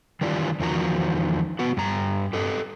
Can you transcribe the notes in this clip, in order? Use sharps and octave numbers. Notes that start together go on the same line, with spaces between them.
D#3 E3 G3 D4 F4
E2 D#3 F3 D#4 F#4 A#5
B3 F#4
G2 A#5
G4 A4 D#5